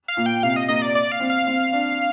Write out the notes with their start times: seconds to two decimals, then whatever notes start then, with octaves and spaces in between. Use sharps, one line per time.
0.08 F5
0.17 A#2
0.26 G5
0.43 C3 F5
0.56 D#5
0.68 A#3 D#5
0.82 D5
0.95 D5
1.12 F5
1.20 C4
1.30 F5
1.47 C4
1.73 D4